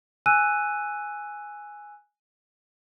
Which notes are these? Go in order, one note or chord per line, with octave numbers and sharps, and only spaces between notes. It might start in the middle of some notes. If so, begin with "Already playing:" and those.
G#5 E6 F#6 D#7